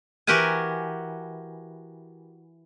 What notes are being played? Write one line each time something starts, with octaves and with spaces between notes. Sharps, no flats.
E3 F#4 G4 A#4 F#5 G#5